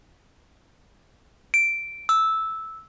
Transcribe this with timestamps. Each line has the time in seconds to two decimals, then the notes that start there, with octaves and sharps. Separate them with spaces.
1.54 D7
2.09 E6